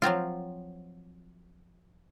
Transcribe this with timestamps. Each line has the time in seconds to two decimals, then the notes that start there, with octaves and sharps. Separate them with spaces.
0.02 F3 F#3 C4 F4